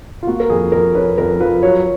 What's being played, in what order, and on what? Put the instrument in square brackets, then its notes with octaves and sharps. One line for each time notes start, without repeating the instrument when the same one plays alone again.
[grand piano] F4
[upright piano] A#3 [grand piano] F#4
[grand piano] A#4
[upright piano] F2 [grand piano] G#4
[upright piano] F2 [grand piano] A#4
[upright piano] C#4 [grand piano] B4
[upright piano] F2 [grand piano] A#4
[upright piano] F3 [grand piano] B4
[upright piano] F#3 [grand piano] C#5